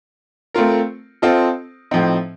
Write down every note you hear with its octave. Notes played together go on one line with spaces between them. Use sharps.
A3 C4 F4 A#4
C4 F4 A4 C5 D#5
A2 F3 C4 D#4